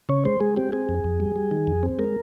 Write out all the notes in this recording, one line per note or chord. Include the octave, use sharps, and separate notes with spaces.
C#3 C#5
G#3 C5
G#3 G#4
C4 G4
C4 G#4
F2
F2
G3
G3
D#3
F2
C4
G#3 A#4